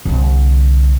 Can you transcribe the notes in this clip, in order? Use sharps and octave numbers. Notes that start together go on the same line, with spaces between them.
C2 D3